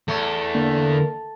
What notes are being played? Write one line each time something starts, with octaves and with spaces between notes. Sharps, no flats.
E2 A3
D3 A#3